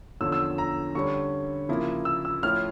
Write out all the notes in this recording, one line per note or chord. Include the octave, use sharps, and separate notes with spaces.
E2 D3 F3 C#4 E6
E6
A#5
D3 G3 C#4 C#6
C#3 F3 A#3 E4
E6
E6
A2 F3 C#4 E4 F6